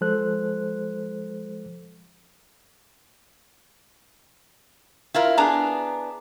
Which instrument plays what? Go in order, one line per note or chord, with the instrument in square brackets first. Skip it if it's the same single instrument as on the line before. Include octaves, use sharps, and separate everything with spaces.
[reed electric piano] F3 G#3 A4 C5 F#6
[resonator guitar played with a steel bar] E4 F4 A#4
[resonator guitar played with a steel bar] B3 D4 G#4 [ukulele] A#5